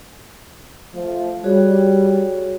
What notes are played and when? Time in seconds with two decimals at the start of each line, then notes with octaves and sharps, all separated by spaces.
0.94 F3 A3
1.44 G3 F#4 G#4 C#5